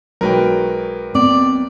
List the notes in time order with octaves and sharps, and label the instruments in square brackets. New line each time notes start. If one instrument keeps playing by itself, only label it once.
[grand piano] B1 F#3 G#3 [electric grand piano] A#4 B4 G5
[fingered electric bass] B3 C4 [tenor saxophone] D5